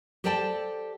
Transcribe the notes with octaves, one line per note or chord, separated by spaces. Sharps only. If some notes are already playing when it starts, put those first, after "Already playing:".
G4 A4 C5 D5 G5 A5